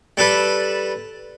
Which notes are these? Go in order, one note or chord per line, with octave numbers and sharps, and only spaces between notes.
G3 A4 B4